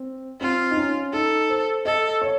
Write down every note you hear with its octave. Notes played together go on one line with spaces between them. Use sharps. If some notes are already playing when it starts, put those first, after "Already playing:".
Already playing: C4
C4 F4
D#4
C#4
D#4 A4
C5
A4 D#5
C#5